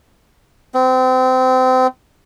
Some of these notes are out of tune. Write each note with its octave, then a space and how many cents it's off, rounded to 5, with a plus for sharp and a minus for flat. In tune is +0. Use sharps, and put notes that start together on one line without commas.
C4 -30